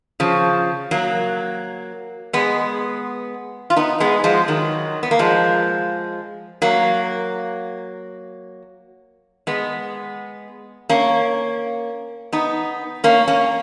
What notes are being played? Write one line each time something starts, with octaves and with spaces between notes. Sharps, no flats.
C#3 F3
F#3 A#3
G#3 B3
F4
B3 D#4
G#3 B3
F3 G#3
D#3 F#3
B3
A#3
F3 G#3
F#3 A#3
G#3 B3
A#3 C#4
B3 D#4
A#3 C#4
A#3 C#4